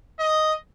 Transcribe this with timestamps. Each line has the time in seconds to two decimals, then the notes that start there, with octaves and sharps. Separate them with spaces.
0.19 D#5